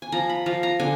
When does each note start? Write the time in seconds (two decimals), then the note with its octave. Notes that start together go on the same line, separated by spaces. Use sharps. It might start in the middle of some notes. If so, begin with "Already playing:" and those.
0.02 G#5
0.12 F3 A#5
0.29 B5
0.46 F3 A#5
0.63 A#5
0.80 D3 G#5